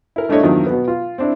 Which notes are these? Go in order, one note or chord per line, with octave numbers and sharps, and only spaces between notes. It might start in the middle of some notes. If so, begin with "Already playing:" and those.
E4 A#4
G2 A3 D4 E4 C#5 D#5
E2 G2 D#3 F3 F#3
B2 B3
F4
C4 D4 E4